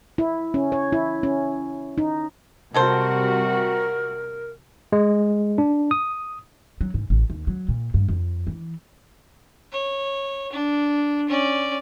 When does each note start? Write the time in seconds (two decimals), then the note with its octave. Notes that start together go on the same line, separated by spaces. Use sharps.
0.18 E4
0.54 C#4
0.72 C#5
0.93 E4
1.23 C#4
1.98 D#4
2.74 C3 G3 G#3 F#4 A4 A#4 C5
4.92 G#3
5.58 D4
5.91 D#6
6.81 F#3
6.94 G#2
7.10 A1
7.30 D#2
7.47 F#3
7.68 A#2
7.94 G2
8.08 F2
8.47 E3
9.72 C#5
10.52 D4
11.29 C#4 D5